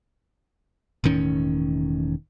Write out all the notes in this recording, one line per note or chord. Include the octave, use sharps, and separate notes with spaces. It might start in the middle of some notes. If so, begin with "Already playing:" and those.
E1 A2 D#3 C#4